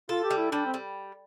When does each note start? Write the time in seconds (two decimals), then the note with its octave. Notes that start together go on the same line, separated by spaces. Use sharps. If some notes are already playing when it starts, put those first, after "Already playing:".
0.09 F4 A4
0.24 G4
0.30 G3
0.37 E4
0.51 G3 D4
0.66 C4
0.74 G3